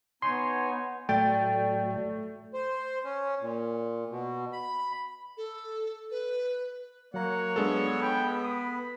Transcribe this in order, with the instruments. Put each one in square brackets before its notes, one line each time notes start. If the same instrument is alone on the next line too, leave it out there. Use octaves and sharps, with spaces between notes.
[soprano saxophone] B3 [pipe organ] D#4 C#5 G#5 [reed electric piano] C6
[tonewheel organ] A2 F#3 [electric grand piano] A3 A6 [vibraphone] D5 [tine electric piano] G5
[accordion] C5
C#4
A#2
B2
B5
[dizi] A4
B4
[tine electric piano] F#3 A#5 [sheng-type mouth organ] A#3 F#5 [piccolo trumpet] C#5
[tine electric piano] F#3 D4 [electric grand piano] G#3 A4 [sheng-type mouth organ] B3
[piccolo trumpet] G5 [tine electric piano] B5
[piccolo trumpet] B5 [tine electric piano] D#6